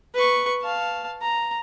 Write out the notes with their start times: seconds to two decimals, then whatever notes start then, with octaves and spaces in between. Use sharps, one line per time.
0.15 B4 C#6
0.62 F5 A5
1.22 A#5